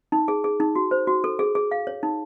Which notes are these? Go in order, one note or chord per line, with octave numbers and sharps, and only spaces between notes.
D#4
G#4
G#4
D#4
F#4
C5
F#4
A4
G#4
G#4
F5
C#5
D#4